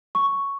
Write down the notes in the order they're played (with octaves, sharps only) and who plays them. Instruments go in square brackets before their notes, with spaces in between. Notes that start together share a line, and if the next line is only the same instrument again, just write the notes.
[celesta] C#6